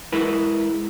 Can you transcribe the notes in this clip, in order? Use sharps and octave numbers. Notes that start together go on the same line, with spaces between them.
G#3 E4 A#4 B4